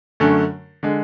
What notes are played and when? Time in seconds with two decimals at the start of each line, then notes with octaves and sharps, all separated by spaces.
0.20 F#2 D3 A3 C#4
0.83 D3 G#3